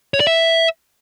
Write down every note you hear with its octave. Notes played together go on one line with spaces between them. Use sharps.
C#5
D5
E5